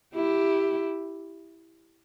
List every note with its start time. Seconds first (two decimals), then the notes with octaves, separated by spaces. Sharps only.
0.15 E4 G4